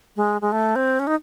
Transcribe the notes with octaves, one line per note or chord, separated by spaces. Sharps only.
G#3
G#3
A3
C4
C#4
D#4